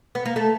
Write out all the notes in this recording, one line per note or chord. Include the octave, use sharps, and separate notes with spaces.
B3
A#3
A3